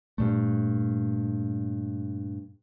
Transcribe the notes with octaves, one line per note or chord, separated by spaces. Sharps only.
G2 A#2 A3